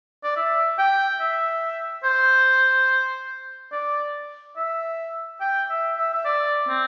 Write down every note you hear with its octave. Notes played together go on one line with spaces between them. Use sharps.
D5
E5
G5
E5
C5
D5
E5
G5
E5
E5
E5
D5
C4